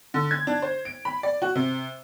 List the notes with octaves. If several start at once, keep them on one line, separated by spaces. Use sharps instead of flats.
D3
G#6
D4
C5
D7
B5
D5
F#4
C3